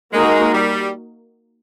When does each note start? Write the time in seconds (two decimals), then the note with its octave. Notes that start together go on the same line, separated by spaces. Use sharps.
0.13 G#3 A#3 D#4 F#4 A#4
0.53 G3